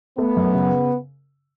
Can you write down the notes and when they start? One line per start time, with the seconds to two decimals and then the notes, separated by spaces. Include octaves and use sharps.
0.18 A3 B3
0.37 F#2
0.55 C#3